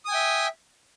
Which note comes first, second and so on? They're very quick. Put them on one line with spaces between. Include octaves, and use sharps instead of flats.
D#6 G#5 G5 E5